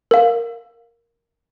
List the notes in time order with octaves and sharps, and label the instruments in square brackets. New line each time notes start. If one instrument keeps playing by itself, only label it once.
[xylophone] A#4 F5